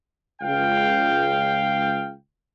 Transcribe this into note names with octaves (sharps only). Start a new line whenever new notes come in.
C#2 F5 G5